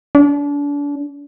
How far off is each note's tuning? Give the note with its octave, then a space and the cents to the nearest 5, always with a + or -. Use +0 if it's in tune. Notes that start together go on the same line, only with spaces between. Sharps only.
D4 -35